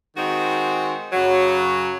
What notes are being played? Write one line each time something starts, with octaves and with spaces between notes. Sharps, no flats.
D#3 G#3 C4 D#4 F#4
F#2 C#3 F#3